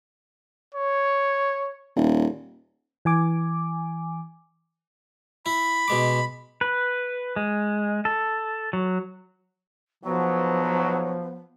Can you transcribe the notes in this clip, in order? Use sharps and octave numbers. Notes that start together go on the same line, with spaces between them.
C#5
D#1
E3 G#5 D6
E4 B5
B2 G#3 D6
B4
G#3
A4
F#3
B1 F3 F#3 B3